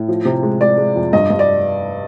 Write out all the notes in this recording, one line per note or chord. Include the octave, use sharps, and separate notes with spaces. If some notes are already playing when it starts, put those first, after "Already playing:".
Already playing: A2
F3
C3
G#3
G#3 D5
G#3
F2
G2 D#5
G2
D5